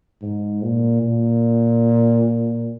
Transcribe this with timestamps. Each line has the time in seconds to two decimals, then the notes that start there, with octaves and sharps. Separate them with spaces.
0.22 G#2
0.63 A#2
1.03 A#2